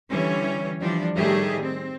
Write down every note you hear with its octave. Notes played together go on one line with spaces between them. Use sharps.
D3 E3 G3 C#4 C#5
E3 F3 G3 D4
A2 D#3 G3 A3 G4 G#4
C4